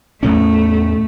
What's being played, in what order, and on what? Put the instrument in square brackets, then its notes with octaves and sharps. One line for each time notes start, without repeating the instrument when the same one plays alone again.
[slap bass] E2 A2 C#4 [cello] A3